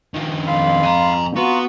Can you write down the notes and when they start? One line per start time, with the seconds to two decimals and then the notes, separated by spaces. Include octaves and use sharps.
0.14 D#3 F3
0.47 F2 F4 F5 B5
0.83 G#5 A#5
1.36 B3 F4 F#4 A#5 C#6